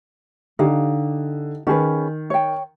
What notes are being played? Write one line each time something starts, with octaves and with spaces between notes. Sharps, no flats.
D3 D#4 G4 F5
D#3 C#4 G#4 B4
C#5 G5